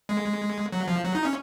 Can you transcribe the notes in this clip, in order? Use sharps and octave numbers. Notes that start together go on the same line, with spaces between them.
G#3
F#3
F3
F#3
D#4
C#4